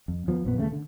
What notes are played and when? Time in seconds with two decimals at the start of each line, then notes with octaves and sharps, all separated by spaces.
0.08 F2
0.27 E2 F3 A#3 B3
0.45 A#1 F2 A#2 B3
0.57 D#2 C#3 E3 A3
0.72 D3